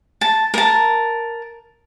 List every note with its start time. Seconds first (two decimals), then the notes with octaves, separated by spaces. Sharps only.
0.21 A5
0.54 A#4 A5